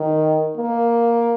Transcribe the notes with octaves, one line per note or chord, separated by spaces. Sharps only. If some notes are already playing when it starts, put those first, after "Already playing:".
Already playing: D#3
A#3